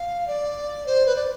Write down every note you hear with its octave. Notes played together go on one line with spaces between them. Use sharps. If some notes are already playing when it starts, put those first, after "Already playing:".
Already playing: F5
D5
C5
B4
D5